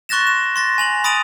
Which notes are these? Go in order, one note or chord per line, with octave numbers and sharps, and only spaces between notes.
C6 C#6 F#6 A6 A#6 E7
E7
C6 A6 A#6
G#5 F7 F#7
B5 D#6 A6 D7 D#7 F7